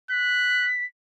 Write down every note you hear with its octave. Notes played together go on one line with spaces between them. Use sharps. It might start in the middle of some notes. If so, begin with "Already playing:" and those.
F#6 B6